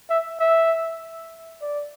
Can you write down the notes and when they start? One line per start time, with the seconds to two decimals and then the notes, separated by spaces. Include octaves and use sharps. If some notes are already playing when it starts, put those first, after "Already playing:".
0.10 E5
0.40 E5
1.62 D5